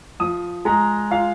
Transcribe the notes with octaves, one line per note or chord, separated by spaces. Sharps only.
F3 D#6
G#3 A#5
F4 F5